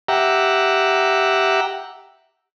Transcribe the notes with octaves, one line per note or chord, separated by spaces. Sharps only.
G4 E5 F#5 A#5